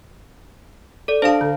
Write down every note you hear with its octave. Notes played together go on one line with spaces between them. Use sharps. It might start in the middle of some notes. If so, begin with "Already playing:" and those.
A4 D5
D4 G4 C5 F5 A5
D3